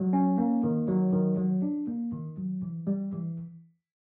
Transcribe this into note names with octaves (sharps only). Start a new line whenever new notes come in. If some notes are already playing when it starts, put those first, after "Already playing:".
Already playing: F#3
C#4
A#3
D#3
F#3
D#3
F#3
D4
A#3
D#3
F#3
E3
G3
E3